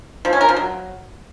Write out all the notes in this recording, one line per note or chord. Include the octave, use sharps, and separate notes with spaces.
F3
C#4
A#4
F3
F#3